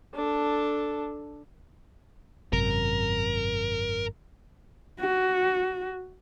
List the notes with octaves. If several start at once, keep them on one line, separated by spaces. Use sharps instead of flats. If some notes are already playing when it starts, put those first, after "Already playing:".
D4 A4
G#1 F#2 C3 A#4
F#4